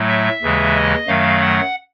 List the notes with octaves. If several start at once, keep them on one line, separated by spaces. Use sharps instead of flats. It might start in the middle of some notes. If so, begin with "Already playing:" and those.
Already playing: A2 F#3 A3
E5
D#2 C#3 E3 G#3
D#5
F#2 D#3 F#3 A3 F5
F#5